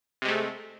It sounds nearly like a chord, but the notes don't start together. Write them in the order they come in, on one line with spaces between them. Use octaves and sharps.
C3 G#3 A3